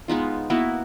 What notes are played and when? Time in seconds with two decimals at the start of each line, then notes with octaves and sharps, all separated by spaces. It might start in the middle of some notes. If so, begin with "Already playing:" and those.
0.08 G#3 B3 D#4 F4
0.50 A#3 B3 E4 F#4